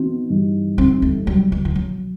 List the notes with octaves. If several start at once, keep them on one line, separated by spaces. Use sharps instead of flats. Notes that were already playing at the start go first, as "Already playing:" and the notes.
Already playing: E3 B3 C4 D#4 F#4
G2 E3 G3 D#4
C4
A3
C2 B2 F#3 G3
E3
E3
F#3